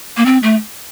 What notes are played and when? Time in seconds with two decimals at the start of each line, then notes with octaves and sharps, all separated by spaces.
0.17 A#3
0.26 C4
0.43 A3